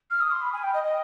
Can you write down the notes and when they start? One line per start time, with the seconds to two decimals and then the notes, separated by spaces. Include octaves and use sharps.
0.10 F6
0.20 D#6
0.31 C6
0.42 B5
0.53 G#5
0.63 G5
0.73 D#5
0.84 D#5